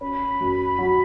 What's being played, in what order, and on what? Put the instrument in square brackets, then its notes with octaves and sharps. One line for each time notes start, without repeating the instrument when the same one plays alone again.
[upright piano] C#4 [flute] B5
[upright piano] F#2
F#3